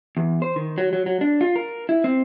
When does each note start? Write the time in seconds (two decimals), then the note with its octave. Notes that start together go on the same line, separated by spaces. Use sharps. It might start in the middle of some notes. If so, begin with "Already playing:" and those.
0.17 E2
0.42 C5
0.56 D#3
0.78 F#3
0.93 F#3
1.06 F#3
1.21 D4
1.41 F4
1.56 A#4
1.89 E4
2.04 C4